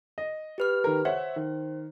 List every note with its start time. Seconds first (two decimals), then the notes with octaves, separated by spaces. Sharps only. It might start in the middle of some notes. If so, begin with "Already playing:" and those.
0.18 D#5
0.58 G4 B4 F6
0.84 D#3 A#4
1.05 C5 C#5 E5 F#5
1.36 D#3